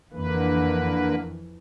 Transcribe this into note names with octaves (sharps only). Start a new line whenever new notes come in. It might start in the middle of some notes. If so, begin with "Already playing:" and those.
F2 D3 E3 A#3 B4